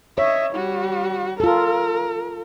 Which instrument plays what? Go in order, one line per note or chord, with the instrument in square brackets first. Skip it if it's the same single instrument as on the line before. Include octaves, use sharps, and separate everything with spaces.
[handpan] C#5 [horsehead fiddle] D#5 E5
[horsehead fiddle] G3 F#4
[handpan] F4 A4 [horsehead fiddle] A#4